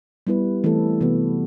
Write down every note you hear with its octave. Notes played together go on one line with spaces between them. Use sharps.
G3 B3 E4 B4
E3 A3 C4 E4 A4
C3 E3 B3 F#4